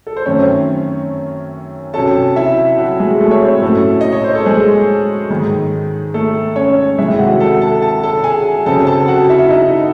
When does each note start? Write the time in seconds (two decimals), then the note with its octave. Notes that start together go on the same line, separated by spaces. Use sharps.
0.07 A4
0.17 C5
0.26 F#2 D#3 A3 C4 C#4 C#5
1.94 C3 F#3 C#4 A4 A5
2.36 E4 E5
2.78 F#3 F#4
2.99 G#3 G#4
3.20 A3 A4
3.31 C#5
3.41 C4 C5
3.62 A2 F#3 A3 C#4 A4
4.01 D#5
4.13 C#5
4.24 C5
4.35 A4
4.46 G#3 G#4
5.30 G#2 D#3 G#3
6.14 A3 A4
6.56 C#4 C#5
6.98 C3 D#3 G#3 E4 E5
7.19 F#4 F#5
7.40 A4 A5
7.61 A4 A5
7.82 A5
8.03 A4 A5
8.24 G#4 G#5
8.66 C#3 F#3 C4 A4 A5
8.87 A4 A5
9.08 F#4 F#5
9.29 E4 E5
9.50 D#4 D#5